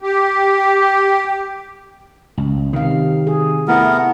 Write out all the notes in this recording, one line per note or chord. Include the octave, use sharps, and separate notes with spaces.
G4
C#2
C3 D#3 F5
G#4
A3 B3 E4 A#4